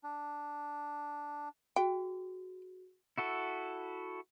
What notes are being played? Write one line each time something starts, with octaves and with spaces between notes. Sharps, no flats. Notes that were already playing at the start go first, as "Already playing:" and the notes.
D4
F#4 G#4 G5
E4 F#4 A4